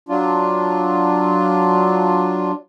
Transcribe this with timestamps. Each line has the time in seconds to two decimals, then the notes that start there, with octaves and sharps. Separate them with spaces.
0.09 F#3 D4 F4